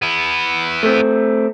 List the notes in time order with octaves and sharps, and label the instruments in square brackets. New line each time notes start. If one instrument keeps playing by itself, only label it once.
[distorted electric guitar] B3 E4
[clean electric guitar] A3 C4